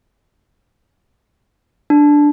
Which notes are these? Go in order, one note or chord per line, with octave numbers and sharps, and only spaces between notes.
D4